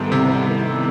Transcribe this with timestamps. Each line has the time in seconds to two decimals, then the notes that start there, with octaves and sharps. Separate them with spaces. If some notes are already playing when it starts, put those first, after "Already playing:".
Already playing: G#2 D#3 G3 B3 E4 A4
0.12 C3